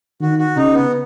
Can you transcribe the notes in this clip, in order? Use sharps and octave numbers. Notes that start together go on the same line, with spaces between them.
D#3 F#4
F#4
C#3 D#4
B3